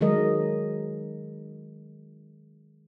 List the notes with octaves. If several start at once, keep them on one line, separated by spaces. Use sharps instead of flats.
D#3 F#3 G#3 A#4 D#5